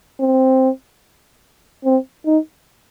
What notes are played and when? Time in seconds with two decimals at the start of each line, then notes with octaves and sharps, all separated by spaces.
0.20 C4
1.85 C4
2.26 D#4